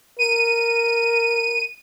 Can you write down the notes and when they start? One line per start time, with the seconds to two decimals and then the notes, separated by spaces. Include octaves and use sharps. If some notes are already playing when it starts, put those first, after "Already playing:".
0.19 A#4 D#7